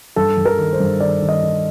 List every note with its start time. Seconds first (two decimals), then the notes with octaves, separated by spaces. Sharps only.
0.16 G2 A4
0.38 G2
0.45 A#4
0.58 D#3
0.73 C5
0.80 G2
1.00 D#3 D5
1.22 D#3
1.29 D#5
1.43 D#3